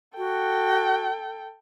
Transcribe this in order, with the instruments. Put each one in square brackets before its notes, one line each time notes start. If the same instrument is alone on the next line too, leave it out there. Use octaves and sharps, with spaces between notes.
[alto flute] F#4 [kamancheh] A4 G5